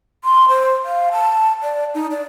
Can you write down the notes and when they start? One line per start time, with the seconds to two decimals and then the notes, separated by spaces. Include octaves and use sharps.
0.24 C6
0.49 C5
0.85 F5
1.12 A5
1.62 D5
1.95 D#4
2.11 D5